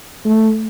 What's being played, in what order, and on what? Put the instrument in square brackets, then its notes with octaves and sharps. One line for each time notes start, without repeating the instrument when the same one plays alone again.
[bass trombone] A3